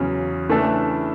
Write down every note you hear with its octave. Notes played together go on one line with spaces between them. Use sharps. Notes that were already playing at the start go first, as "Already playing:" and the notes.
Already playing: E2 C#3 F#3
C#3 E3 A3 D4 A4